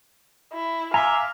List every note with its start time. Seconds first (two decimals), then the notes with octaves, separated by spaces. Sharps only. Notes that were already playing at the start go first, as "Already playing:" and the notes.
0.53 E4
0.94 E5 F5 G#5 A#5 C6 D6